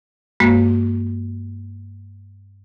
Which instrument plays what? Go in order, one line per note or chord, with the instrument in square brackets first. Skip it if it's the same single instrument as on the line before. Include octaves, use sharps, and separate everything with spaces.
[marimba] G2 G#3 A#3 F#4